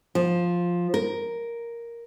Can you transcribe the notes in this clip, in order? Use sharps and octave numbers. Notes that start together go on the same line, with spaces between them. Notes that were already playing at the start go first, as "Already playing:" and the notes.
F3
A#4